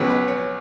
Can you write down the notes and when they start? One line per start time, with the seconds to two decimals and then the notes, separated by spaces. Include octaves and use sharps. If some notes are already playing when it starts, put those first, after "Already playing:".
Already playing: C#2 B2 F#3 B4
0.10 B4
0.28 C#5